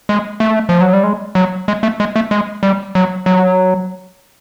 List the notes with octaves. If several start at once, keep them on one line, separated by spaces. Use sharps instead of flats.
G#3
A3
F3
F#3
G3
G#3
F#3
G#3
A3
G#3
A3
G#3
G3
F#3
F#3